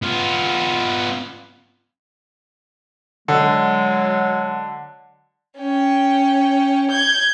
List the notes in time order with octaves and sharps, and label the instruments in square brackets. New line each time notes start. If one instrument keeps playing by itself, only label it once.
[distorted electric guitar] B3 F4
[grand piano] D3 [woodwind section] F#3 G#3
[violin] C#4 G5
G6 G#6